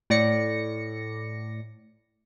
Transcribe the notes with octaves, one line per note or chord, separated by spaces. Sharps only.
A2 D5 A#6 C#7